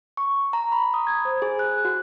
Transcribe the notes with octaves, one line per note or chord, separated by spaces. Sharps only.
C#6
A#5
B5
D#6
G#6
C5
G#4
F#6
F#4